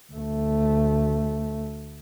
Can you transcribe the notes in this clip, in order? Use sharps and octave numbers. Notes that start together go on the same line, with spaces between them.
D2 A3